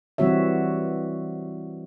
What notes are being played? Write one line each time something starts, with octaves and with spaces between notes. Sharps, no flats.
E3 G3 C4 F#4 C#5 E5